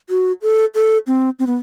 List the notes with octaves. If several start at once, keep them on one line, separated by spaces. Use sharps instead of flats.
F#4
A4
A4
C4
C4
B3